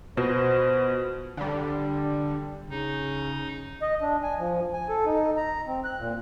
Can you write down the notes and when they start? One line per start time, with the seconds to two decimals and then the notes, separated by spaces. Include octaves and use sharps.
0.17 B2 F4 B4 C5
1.37 D3 G3
2.70 C#3 D#4
3.82 D#5
4.02 D4
4.23 G#5
4.39 F3
4.73 G#5
4.89 A4
5.06 D#4
5.37 A#5
5.68 C4
5.84 F#6
5.98 A#2